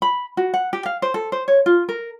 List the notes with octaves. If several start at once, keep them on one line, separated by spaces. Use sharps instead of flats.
B5
F#4
F#5
G4
F5
C5
A4
C5
C#5
F4
A#4